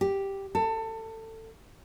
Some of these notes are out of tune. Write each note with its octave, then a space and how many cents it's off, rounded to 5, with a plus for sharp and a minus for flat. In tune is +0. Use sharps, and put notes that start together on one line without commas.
G4 +0
A4 +25